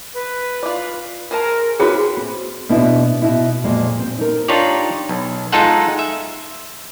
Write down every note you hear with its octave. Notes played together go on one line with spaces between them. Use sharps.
B4
F4 D5
G#4 A#4 C5 A5
C4 C#4 E4 F#4 G#4 B4
C4
B2 B3 D4 E4 F#4
B2 E4
F2 A#2 F#3 G#3
C4
D#4 A#4
D4 D#4 F4 G4 C#5 D5
B1
G#3 D#4 F4 A4 F#5
E5